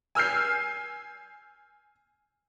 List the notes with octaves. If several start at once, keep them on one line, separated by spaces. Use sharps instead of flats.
G#5 E6 F6 G6 C7